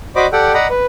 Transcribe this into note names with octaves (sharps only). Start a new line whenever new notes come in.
F#4 C5 D5 D#5 B5 D6
G4 A4 D5 F#5 G5
D5 D#5 F#5 A#5 B5
B4